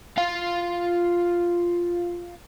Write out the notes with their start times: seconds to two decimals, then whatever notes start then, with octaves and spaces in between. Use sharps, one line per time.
0.17 F4 F5